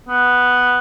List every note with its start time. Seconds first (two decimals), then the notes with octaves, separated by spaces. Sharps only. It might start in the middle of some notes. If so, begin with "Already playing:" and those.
0.09 B3